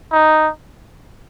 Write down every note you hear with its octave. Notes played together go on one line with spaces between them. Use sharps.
D#4